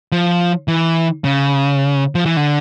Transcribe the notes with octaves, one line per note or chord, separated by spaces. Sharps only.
F3
E3
C#3
F3
E3
D3